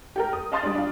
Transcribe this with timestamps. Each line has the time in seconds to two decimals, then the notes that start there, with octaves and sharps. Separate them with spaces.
0.16 G4 A4 A#4
0.33 D#6
0.52 D#5 F5 A5 C6 D#6 A6
0.63 G3 D4
0.75 D4 F4